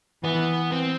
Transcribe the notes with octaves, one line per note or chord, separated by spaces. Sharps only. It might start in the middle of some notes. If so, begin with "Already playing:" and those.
E3 B3
C4